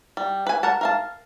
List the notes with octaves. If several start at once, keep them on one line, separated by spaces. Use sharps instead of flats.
G3
B4 G#5
A#4 F#5 A5
A#4 F5 A5